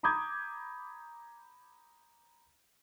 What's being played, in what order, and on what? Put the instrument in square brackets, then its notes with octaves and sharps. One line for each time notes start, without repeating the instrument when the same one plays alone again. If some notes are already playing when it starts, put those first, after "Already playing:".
[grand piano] A#5 B5 D6 D#6 G6 G#6